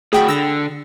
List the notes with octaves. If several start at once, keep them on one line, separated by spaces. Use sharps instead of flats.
A2 F#4 G#4 G5 B5
D3 E6 A#6